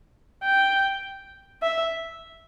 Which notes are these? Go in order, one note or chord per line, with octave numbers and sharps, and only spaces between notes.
G5
E5